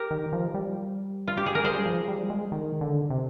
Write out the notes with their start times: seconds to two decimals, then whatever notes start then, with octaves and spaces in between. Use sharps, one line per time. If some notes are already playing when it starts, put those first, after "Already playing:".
Already playing: G4 A#4
0.11 D#3
0.33 F3
0.54 G3
1.28 F4
1.37 G4
1.46 G#4
1.55 A#4
1.63 G3 G#4 C5
1.86 F3
2.08 G3
2.30 G#3
2.52 D#3
2.81 D3
3.10 C3